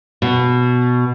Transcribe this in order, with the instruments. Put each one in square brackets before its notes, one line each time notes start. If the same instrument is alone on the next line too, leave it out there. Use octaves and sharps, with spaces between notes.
[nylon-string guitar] B2